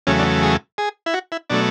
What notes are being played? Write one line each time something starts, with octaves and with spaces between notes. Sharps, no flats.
E2 C#3 F#3 A3 C#4
D4
G#4
G#4
E4
F#4
E4
B2 F#3 A3 D4